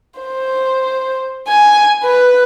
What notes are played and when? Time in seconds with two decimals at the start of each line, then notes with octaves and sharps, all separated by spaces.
0.20 C5
1.48 G#5
2.03 B4